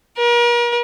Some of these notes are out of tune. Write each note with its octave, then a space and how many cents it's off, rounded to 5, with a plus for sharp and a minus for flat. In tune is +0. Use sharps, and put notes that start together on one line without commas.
A#4 +40